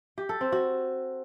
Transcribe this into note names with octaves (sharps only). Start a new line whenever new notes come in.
G4
A4
C4
F#4